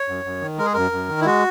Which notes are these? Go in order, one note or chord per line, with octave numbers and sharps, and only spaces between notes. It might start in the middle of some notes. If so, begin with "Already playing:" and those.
Already playing: C#5
F#2
F#2
D#3
G#3 A#4
G#4
F#2 A#4
F#2
D#3
E4
G#3 F#4